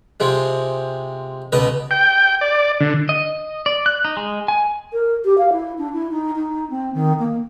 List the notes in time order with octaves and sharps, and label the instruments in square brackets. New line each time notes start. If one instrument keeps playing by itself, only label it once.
[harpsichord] C3 F3 G#3
C#2 B2 B4 D#5
[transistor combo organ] G5
D5
D3
[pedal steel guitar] D#5
D5
F#6
D#4
G#3
G#5
[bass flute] A#4
G4
F5
E4
D4
E4
D#4
D#4
C4
D#3
A#3